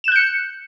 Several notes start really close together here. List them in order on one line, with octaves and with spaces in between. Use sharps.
E7 F#6 G6 C#7